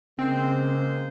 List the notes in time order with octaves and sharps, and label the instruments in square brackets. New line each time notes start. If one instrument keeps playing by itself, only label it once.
[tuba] C#3 [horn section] G#3 A#3 C5 [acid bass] C4